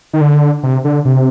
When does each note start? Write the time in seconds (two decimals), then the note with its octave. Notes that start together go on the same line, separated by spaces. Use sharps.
0.13 D#3
0.21 D3
0.63 C3
0.85 D3
1.05 C3